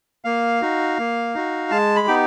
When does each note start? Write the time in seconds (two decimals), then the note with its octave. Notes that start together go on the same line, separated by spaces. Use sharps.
0.24 A#3 F5
0.62 D#4 F#4
0.99 A#3
1.35 D#4 F#4
1.71 G#3 A5
1.96 B5
2.07 B3 D#4 G4